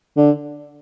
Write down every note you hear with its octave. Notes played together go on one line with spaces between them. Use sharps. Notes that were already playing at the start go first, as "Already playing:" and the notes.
D3